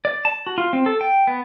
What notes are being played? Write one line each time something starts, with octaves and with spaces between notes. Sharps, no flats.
D5
A5
F#4
F4
C4
A4
G5
B3